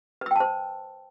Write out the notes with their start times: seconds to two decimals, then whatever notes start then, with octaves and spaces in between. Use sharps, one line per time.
0.21 B4
0.26 E6
0.31 G5
0.36 A5
0.40 C5